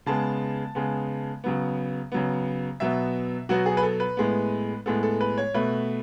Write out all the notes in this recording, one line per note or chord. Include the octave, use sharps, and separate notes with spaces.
C#3 G#3 B3 A5
C#3 G#3 B3
C#3 F#3 B3
C#3 F#3 B3
B2 F#3 B3 E5
B2 F#3 B3 F#4
G#4
B4
A4
B4
A2 G#3 B3
A2 G#3 B3 A4
A4
B4
C#5
B2 A3 B4